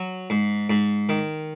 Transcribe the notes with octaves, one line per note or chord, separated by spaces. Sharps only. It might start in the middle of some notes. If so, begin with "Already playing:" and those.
Already playing: F#3
G#2
G#2
D#3